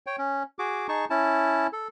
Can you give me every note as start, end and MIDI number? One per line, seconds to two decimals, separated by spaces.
0.07 0.16 73
0.07 0.16 79
0.18 0.43 61
0.59 0.87 66
0.59 0.87 68
0.59 0.87 86
0.89 1.05 63
0.89 1.05 68
0.89 1.05 81
0.89 1.05 85
1.10 1.67 61
1.10 1.67 64
1.10 1.67 81
1.73 1.88 69